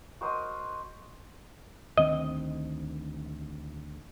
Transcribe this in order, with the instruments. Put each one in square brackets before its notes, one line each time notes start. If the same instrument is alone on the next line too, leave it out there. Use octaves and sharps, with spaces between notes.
[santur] F#4 A#4 C5 D#5
[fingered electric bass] D2 D#3 C4 [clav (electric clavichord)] D#5